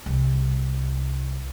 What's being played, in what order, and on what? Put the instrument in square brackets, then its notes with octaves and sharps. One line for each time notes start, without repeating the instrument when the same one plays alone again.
[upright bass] C2